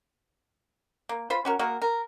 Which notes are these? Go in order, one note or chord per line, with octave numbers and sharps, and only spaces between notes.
A#3
F4 C5 B5
C#4 F#4 A#4
A#3 F#4 G#4 A#4
A#4